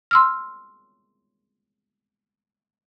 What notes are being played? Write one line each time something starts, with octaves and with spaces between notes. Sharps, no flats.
C6 E6 F6